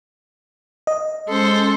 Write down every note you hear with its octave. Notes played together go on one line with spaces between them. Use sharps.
D#5
G#3 C#4 A4 C5